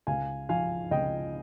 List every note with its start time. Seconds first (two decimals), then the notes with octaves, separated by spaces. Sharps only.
0.07 C#2 F5 G#5
0.49 F3 F5 G#5
0.91 C#2 D#5 G5